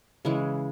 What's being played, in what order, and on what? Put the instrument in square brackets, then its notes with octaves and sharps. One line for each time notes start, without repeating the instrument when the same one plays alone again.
[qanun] C#3 E3 G#3